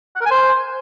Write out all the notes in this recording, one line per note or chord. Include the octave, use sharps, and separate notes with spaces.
F#5
A#4
G#5
C5